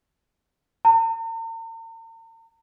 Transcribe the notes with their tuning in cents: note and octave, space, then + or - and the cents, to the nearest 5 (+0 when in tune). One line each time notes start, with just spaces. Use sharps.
A#5 -45